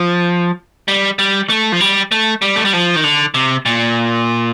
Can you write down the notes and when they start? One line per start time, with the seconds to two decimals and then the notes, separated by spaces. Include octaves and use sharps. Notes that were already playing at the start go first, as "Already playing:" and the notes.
Already playing: F3
0.88 G3
1.19 G3
1.49 A3
1.72 F3
1.80 G3
2.12 A3
2.42 G3
2.56 A3
2.65 G3
2.73 F3
2.96 D#3
3.04 D3
3.34 C3
3.66 A#2